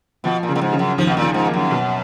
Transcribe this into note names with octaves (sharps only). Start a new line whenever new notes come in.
B2 F3
A#2
C#3
A#2
G#2
C#3
F#2
D#2 F3
B2
A#2 F3
G#2
A#3
F#2
B2